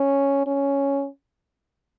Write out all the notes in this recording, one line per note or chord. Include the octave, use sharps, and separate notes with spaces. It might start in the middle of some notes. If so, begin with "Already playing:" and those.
Already playing: C#4
C#4